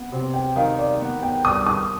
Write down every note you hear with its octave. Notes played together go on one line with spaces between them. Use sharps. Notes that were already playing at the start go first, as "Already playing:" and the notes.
Already playing: B3
C3
G5
D#3 F5
D5
B3
G5
G2 D#6
D#6